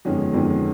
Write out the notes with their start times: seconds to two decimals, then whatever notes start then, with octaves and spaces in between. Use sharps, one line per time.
0.05 G1 F2 D#3 G#3 C#4
0.32 G1 F2 D#3 G#3 C#4